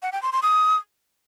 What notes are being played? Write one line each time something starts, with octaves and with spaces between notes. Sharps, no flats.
F#5
G5
C6
C6
D#6